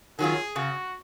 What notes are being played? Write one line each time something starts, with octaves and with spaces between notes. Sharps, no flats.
D#3 F#3 C#4 F4 G#4
C#3 F#4